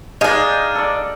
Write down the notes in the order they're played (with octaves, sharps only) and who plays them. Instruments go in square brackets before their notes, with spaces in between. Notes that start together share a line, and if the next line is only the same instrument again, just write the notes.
[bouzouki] G#3 D4 [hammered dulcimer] D#4 D#5 F5
[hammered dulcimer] A4 D5